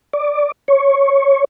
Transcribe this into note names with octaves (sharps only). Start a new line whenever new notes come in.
D5
C#5